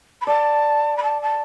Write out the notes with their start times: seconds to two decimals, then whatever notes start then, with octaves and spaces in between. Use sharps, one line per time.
0.21 B5
0.27 D5 A5
0.97 B5
1.03 A5
1.22 A5